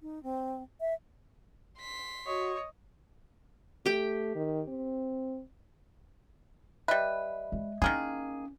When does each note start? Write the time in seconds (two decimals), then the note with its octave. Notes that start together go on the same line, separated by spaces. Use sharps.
0.01 D#4
0.23 C4
0.81 E5
1.79 C6 B6
2.27 F#4 C#5 D#5
3.86 A3 G4 G5
4.35 D#3
4.69 C4
6.88 G3 B4 D#5 E5
7.52 G#3
7.82 D#3 A#3 C#4 E4 G#4